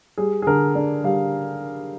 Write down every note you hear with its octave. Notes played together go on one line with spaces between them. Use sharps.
G3 G#4
G#4
D3 A#4
D3 D5
G3 F5